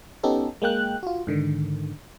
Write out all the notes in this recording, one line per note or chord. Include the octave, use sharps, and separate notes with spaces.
B3 C#4 D#4 G4 A4
G#3 A#3 G5 F#6
F4 F#4
G#2 D3 D#3